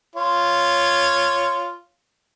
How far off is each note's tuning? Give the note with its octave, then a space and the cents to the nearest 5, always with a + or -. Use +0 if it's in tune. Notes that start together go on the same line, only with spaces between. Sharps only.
F4 -10 C#5 +0